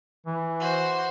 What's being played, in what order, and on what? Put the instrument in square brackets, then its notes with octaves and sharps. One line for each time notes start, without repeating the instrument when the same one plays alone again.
[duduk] E3
[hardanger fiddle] F#4 C5